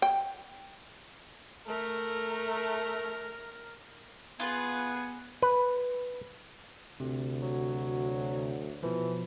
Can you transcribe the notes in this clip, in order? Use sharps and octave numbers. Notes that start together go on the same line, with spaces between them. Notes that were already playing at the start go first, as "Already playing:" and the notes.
G5
A3 A#4
B3 F4 G#4 B4
B4
D2 C3
F#3
B2 E3 F3